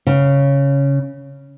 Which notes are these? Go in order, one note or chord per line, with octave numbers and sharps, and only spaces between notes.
C#3